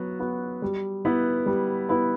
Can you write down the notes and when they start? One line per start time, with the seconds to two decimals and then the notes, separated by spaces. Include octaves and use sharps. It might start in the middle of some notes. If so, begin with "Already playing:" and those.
Already playing: F#3 B3 F#4
0.20 B3 F#4
0.62 G3
1.05 B3 E4 B4
1.46 G3
1.89 B3 E4 B4